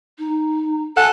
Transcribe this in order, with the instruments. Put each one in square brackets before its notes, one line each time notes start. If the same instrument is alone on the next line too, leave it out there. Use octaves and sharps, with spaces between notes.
[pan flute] D#4
[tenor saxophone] A4 [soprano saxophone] F#5 [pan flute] G#5